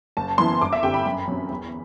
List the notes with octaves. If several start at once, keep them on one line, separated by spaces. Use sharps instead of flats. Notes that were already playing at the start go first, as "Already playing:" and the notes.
F#1 A5
F#2 E3 B3 E4 C6
G1 D6
E5
G2 D3 G3 C4 G5
B5
F#2
F#3 C4
E2